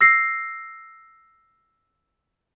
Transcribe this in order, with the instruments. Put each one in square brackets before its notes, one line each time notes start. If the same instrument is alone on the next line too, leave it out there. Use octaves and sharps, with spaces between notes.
[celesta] E6 A#6 C7